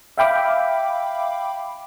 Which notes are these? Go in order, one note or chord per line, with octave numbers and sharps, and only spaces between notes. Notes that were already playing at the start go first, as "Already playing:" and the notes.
E5 F5 G5 B5 D6